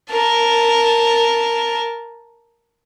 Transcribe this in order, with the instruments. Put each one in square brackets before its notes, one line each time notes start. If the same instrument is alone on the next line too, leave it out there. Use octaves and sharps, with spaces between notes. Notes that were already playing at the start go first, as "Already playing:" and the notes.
[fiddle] A#4 A5